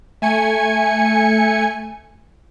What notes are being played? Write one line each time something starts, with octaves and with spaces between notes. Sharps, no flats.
A3 G#5 C#7